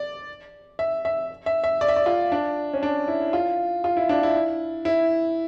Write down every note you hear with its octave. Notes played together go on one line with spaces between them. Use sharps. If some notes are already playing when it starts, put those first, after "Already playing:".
Already playing: D5
E5
E5
E5
E5
D5
E5
D5
F4
D4
C#4
D4
E4
F4
F4
E4
D4
E4
E4